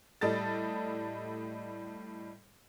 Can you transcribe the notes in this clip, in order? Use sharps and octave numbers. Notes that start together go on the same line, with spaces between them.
A2 G3 A4 D#5 A5 A6